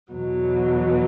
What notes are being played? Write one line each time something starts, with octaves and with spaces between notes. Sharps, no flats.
E2 B2 F#3